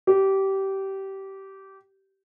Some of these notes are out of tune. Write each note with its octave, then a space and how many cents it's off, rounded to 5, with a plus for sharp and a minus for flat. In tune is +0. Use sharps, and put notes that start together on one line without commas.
G4 -20